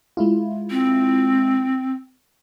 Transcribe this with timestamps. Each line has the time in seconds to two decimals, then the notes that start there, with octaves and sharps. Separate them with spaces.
0.17 G#3 E4 F4
0.70 C4